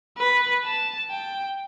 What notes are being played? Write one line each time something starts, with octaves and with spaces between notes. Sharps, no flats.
B4
A5
G5